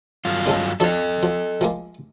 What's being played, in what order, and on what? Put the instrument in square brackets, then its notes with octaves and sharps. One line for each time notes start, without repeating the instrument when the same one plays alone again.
[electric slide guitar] G2 F#3 F4
[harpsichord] C#3 G#3 A4
[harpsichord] F3 D4 [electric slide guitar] A4 D#5
[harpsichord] F3
F3 G#3 A#3